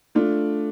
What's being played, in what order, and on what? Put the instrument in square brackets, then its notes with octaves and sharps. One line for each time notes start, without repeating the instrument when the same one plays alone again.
[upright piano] A3 D4 F4